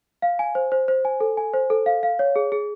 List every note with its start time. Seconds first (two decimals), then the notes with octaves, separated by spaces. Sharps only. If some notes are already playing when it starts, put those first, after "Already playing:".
0.22 F5
0.39 G#5
0.55 C5
0.72 C5
0.88 C5
1.05 G#5
1.20 A4
1.37 G#5
1.54 C5
1.70 A4
1.86 F5
2.03 F5
2.19 C#5
2.36 G#4
2.52 G#4